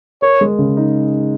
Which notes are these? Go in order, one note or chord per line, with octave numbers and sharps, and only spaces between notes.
A#4 C#5
G#3
C#3
D#4